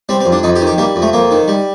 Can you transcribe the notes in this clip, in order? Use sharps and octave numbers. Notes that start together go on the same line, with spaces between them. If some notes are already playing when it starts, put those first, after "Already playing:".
G3 C4
C4
F2
D4
F2 D#4
G4
D#3
G4
G3 A#3
F2
A3
F2 A#3
D#3
G3